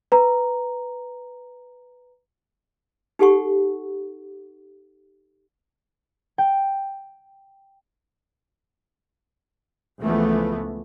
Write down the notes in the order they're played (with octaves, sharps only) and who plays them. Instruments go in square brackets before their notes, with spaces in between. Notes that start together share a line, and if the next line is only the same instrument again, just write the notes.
[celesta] B4 A#5
[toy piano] D#4 G4 A4 F#5 C#6
[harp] G5
[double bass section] C#2 E3 F3 A3 B3